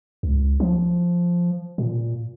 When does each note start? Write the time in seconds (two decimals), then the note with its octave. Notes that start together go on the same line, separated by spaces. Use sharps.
0.23 C#2
0.60 F3
1.78 A#2